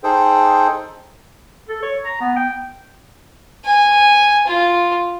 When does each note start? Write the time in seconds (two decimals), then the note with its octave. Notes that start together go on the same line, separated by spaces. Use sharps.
0.03 D#4 G#4 A4 C5 G5
1.69 A4
1.83 C#5
2.05 A#5
2.21 B3
2.36 G5
3.65 G#5
4.47 F4